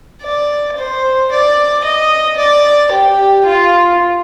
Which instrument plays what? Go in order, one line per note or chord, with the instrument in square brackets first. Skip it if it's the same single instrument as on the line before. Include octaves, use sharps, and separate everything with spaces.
[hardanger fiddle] D5
C5
D5
D#5
D5
G4
F4